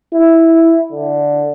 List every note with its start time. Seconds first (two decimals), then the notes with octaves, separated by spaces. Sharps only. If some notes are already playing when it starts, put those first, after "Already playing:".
0.14 E4
0.92 D3